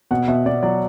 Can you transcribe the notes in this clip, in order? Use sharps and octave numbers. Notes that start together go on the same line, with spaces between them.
B2 F#5
B2 E5
B2 D5
F#3 D5